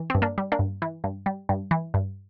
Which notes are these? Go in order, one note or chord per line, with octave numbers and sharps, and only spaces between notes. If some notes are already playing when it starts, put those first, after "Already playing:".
Already playing: E3
G2 C4
A#3 D4
G3
A#3 D4
G2
E3
G2
G3
G2
E3
G2